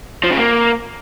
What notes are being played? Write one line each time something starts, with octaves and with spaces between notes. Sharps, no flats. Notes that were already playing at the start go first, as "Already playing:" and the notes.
F3
C#3
A#3